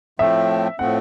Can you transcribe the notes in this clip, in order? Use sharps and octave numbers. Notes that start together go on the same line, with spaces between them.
A2 F3 A3 C4 E5
A2 F3 A3 C4 F#5